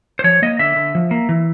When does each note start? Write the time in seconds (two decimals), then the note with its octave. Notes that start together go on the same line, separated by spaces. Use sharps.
0.19 C5
0.24 F3 C#5
0.42 A#3 D#5
0.59 D3 E5
0.76 D3
0.95 F3
1.11 A#3
1.29 E3